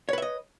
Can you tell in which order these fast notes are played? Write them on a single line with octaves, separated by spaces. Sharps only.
C#5 B4 E5 D#5